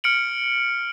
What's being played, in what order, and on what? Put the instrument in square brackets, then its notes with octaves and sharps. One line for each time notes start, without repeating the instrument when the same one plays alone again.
[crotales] F6 C#7 D7 F#7